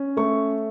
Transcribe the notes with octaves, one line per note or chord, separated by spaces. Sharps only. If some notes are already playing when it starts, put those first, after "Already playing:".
Already playing: C#4
A3 C#6